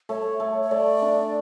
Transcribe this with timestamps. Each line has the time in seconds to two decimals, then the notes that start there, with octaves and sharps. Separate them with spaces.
0.09 A3 C#5
0.40 A3
0.62 C#5
0.71 A3 D5
1.02 D4